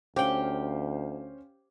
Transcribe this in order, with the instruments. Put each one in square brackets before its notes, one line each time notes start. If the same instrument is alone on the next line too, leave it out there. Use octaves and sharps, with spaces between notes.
[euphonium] D2 [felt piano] C#4 C5 F5 [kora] G4 G5